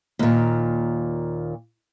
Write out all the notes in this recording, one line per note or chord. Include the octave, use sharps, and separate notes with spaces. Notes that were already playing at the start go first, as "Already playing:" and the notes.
D#2 A#2